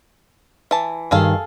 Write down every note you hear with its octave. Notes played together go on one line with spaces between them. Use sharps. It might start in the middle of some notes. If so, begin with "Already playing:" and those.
E3 A5
G2 D#3 G#4 A4 F5